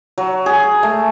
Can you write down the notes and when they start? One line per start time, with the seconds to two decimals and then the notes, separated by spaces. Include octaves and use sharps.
0.18 F#3
0.46 G#4
0.83 A3